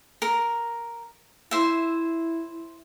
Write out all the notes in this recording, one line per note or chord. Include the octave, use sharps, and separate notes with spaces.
A#4
E4 C5 E5